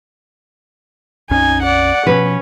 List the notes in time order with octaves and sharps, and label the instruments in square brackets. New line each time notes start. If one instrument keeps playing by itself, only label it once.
[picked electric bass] A#1 F2 C#4 [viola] D#4 G#5
[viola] D5 F#5
[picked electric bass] B2 F3 [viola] C#4 [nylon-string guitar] B4